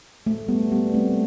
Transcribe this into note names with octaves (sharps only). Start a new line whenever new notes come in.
A3
G3 B3
G3 B3
A3 C4